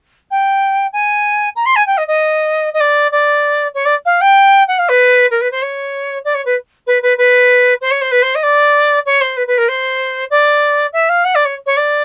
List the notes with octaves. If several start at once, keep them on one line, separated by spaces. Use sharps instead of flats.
G5
G#5
A#5
C6
G#5
G5
D#5
D#5
D#5
D5
D5
C#5
D5
F5
G5
F#5
F5
B4
A#4
B4
C5
C#5
D5
C#5
B4
B4
B4
B4
C5
C#5
C5
B4
C5
D#5
D5
C#5
C5
B4
B4
A#4
C5
D5
E5
F5
F#5
D5
C#5
C#5
D5